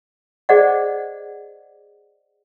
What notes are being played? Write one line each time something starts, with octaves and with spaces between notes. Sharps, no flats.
G#4 C5 D5 D#5 F#5